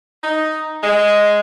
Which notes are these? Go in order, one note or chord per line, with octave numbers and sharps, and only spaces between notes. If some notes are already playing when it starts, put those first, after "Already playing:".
D#4
G#3